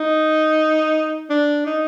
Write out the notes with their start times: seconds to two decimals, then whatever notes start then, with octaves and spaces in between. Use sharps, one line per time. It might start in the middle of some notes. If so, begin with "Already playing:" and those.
Already playing: D#4
1.30 D4
1.66 D#4